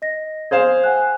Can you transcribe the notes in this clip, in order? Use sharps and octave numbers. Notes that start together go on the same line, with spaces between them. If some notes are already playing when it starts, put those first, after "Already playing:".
D#5 A#6
G#4 C5 F5 G#6 E7
F#5 G#5 F#6